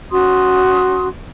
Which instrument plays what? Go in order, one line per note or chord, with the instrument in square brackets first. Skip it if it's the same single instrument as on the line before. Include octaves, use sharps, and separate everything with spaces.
[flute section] C#4 F#4 C6 D#6